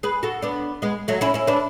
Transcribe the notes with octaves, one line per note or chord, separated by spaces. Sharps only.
G#4 B4
F#4 A4
B3 D4
G#3 B3
F#3 A3
C#4 E4
C#4 E4
B3 D4